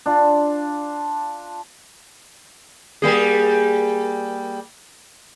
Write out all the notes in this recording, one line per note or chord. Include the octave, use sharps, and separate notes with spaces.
D4 F4
G3 A#3 G#4